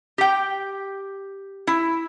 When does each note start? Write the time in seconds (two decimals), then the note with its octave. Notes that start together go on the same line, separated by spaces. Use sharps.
0.18 G4 G5
1.67 E4